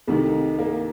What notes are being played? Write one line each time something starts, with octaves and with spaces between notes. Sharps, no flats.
C2 C3 D#3 A3
A#3